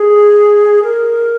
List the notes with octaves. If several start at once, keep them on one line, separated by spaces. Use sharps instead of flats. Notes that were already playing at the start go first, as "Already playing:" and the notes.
Already playing: G#4
A#4